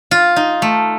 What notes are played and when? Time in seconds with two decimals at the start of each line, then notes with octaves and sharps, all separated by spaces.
0.11 F4
0.36 D#4
0.62 A3